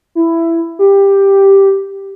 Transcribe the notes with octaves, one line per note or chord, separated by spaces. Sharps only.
E4
G4